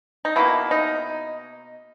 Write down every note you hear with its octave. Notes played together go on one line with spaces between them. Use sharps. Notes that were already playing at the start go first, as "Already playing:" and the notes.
D#4
B2 A#3 E4
D#4